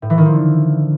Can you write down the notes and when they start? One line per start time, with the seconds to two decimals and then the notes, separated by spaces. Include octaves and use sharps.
0.02 A2
0.10 E3
0.18 D#3
0.26 F3
0.33 D3